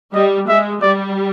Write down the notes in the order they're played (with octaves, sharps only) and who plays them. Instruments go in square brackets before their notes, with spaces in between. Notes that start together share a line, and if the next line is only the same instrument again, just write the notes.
[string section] G3 [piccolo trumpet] D#5
[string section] G#3 [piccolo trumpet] E5
[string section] G3 [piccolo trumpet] D5